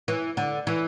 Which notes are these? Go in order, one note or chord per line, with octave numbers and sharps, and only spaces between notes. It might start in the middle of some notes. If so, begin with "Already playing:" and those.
E3
D3
E3